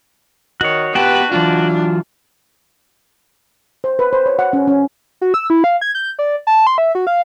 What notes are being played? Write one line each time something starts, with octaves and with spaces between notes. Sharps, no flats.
D#3 F#4 C#5
B3 F#4 G4 B4 G5 A5
E3 F#3 D4 F4
C5
B4
C5
C#5
F#5
C#4
C#4
F#4
E6
E4
F5
G#6
G6
D5
A5
C6
E5
F#4
F5